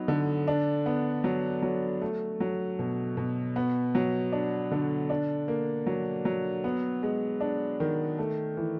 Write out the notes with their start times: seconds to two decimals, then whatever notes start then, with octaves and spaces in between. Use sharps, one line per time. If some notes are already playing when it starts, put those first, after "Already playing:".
Already playing: F#3 B3 D#4
0.08 D3
0.48 D4
0.86 B3
1.24 F#3
1.62 F#3
2.01 A3
2.40 F#3
2.79 B2
3.17 B2
3.56 B3
3.95 F#3
4.32 D4
4.71 D3
5.10 D4
5.48 A#3
5.86 F#3
6.25 F#3
6.64 B3
7.03 G#3
7.41 D4
7.80 D#3
8.18 A3
8.57 E3